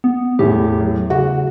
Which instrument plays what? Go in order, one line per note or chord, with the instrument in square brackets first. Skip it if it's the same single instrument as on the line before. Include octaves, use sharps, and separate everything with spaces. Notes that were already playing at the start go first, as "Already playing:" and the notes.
[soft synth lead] B3
[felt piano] E2 A2 [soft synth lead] G4
[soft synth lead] F#3
[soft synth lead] C#3 [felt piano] F#4